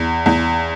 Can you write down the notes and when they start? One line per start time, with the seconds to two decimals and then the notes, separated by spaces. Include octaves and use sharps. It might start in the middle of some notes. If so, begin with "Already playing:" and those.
Already playing: E2
0.26 E2